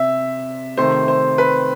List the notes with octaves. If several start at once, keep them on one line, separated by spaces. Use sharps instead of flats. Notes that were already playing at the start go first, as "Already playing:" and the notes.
Already playing: C3 E5
C3 D#3 A3 C5
C5
B4